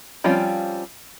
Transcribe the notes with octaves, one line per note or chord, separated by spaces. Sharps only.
F3 G3 C4 C#4 F4